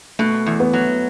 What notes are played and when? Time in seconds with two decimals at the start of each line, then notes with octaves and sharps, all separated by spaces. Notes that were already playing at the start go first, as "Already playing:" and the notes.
0.19 B2 A3
0.46 E2
0.60 B3
0.73 F#3